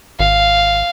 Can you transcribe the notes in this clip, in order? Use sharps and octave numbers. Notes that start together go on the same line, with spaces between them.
G#1 F5